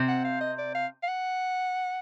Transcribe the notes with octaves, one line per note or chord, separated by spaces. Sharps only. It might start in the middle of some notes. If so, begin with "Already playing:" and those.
Already playing: C3 C4
F#5
F5
D#5
D5
F5
F5
F#5